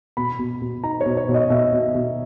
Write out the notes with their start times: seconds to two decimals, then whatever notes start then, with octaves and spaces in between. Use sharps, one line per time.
0.17 B2 B5
0.39 B2
0.62 B2
0.83 D#4 A#5
1.01 C#5
1.06 B2
1.17 C#5
1.29 B2
1.34 D#5
1.50 B2 E5
1.73 B2
1.95 B2